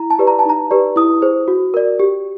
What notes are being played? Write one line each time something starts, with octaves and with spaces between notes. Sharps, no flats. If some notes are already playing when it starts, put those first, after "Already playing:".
Already playing: E4 A#5
A5
G4 B4 D5
A#5
A5
D#4 A#5
G4 B4 D5
E4 D#6
G#4 C5
F#4
A#4 D5
G4